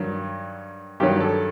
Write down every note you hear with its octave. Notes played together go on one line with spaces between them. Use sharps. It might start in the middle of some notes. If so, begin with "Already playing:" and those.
Already playing: G2 D#3 F#3
G2 D#3 F#3 G4
A4